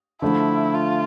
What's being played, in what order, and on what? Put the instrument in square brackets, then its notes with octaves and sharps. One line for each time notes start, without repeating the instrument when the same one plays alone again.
[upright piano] D3 F3 A3 [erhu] E4
[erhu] F4